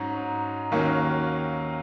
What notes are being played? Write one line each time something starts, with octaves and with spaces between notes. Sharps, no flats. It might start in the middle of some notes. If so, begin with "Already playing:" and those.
Already playing: G#2 F#3 C#4 A#5
D#2 D#3 F#3 A#3 C#4